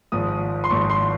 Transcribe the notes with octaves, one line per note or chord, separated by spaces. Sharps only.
G#1 G#2 F3 D#6
C6
G#1 G#2 F3 C#6
C6